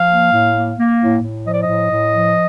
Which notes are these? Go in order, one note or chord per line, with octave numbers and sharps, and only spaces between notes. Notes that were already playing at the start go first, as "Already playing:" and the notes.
Already playing: F3 F5
A#3
A2
A#3
A#3
A2
A2
F3 D#5
D5
D#5
A2
A2
F3